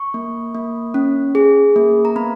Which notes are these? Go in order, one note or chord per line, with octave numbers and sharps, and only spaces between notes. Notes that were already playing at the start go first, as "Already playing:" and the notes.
Already playing: C#6
A#3
A#3
C#4
G#4
A#3
A#5
B3 B5